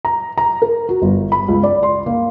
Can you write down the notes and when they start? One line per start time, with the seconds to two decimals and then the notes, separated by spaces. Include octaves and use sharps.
0.05 A#5
0.38 A#5
0.62 A#4
0.89 F#4
1.02 G1
1.32 B5
1.48 C#2
1.64 D5
1.83 C6
2.06 A#3